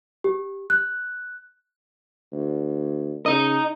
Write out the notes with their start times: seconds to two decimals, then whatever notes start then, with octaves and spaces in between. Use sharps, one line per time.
0.24 G4
0.70 F#6
2.33 D2
3.26 C#3 D#4 D#5